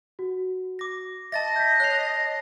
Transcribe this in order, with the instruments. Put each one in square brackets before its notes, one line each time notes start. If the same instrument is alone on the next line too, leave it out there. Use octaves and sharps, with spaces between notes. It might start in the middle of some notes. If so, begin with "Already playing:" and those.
[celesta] F#4
[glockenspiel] D6 A#6
[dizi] D#5 [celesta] E5 [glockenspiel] A5 A6 A#6
[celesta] G6 B6
[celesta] C#5 F7 [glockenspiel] F#6 C7